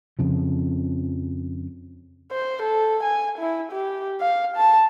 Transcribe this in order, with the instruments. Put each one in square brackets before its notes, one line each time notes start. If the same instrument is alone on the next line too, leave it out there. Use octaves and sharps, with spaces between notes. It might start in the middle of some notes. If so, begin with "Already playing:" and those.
[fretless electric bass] F2 C#3 F3
[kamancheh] C5
A4
G#5
E4
G4
F5
A5